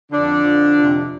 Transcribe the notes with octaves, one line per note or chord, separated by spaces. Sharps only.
F2 D3 F3 D4
F2 F3
F2 C3 F3